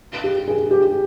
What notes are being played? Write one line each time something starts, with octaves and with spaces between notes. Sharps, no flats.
G4
G#4
G4